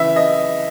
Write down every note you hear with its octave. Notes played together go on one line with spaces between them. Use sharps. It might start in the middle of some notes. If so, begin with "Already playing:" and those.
Already playing: C#3 E3 E5
D#5